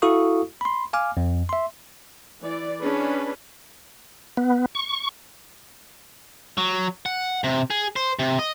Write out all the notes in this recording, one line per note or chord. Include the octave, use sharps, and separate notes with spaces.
E4 F#4 A4 F5 C#6 D#6
B5 C6
F5 G#5 D6 F6
F2
E5 C6
E3 D5
C#4 D4 G#4 B4
B3
C#6
F#3
F#5
C3
G#4
C5
C3
D#5